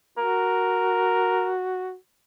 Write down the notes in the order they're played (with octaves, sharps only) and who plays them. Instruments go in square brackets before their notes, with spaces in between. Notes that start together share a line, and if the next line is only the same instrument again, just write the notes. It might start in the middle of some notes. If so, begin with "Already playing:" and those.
[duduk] F#4 [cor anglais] A#4